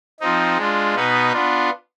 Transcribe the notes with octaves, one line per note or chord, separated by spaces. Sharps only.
F3 C4 D#4
G#3 D4 F4
B2 B3 D#4 B4
B3 D4 F4